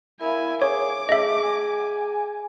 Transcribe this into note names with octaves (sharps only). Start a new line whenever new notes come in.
E4 A#4 E5 F5 G#5
G#4 C#5 D6
A3 G#4 D#5 E5
G#5